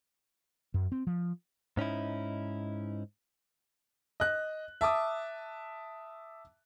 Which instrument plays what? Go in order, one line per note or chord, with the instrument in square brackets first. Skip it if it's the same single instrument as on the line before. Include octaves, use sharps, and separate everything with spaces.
[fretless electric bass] F#2
C4
F3
[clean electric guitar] G#2 C#4 D#4 E4
[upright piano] D#5 F#6
E5 A5 D6 D#6